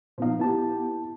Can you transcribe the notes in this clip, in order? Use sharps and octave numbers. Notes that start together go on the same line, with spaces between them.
A#2 F3 B3 D#4 F5
B3 E4 G4 A5